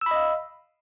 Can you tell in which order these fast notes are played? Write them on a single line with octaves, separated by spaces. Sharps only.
E6 B5 D#5 F5